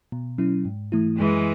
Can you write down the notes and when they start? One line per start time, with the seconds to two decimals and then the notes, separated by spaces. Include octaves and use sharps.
0.12 B2
0.38 F#3 C#4 E4
0.65 G#2
0.92 E3 A3 E4
1.18 F#2 E3 G#3